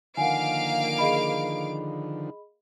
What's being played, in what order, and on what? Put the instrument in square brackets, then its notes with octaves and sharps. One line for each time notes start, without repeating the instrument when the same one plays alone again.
[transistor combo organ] D3 D#3 F3 [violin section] A#3 F5 D7 [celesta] F#5 G#5
[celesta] G#4 D#5 B5